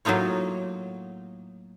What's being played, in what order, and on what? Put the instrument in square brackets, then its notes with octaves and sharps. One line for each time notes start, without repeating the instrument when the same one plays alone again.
[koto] A2 F#3 A#3 D#4 F4 C#5